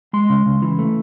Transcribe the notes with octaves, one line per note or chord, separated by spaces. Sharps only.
G#3 C6
C#3
C#3
E3
A3